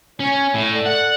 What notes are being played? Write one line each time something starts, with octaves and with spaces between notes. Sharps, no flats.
C#4 C#5 G#5
A2
A4 D5
F#5